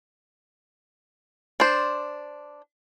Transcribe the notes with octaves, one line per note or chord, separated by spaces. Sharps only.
D4 C5